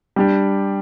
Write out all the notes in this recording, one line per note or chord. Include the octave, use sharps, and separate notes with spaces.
G3 D4 G4